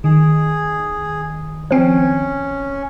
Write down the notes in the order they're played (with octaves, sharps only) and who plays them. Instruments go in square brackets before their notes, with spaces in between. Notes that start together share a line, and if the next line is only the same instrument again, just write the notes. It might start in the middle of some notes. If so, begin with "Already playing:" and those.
[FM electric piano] D#3 [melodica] G#4
[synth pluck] F3 C4 [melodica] C#4